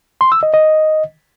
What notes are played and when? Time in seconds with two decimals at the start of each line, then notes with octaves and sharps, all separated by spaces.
0.21 C6
0.32 E6
0.43 D#5
0.54 D#5